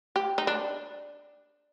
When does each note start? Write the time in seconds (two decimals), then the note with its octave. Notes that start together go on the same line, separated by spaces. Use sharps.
0.16 G4
0.38 D#4
0.47 D4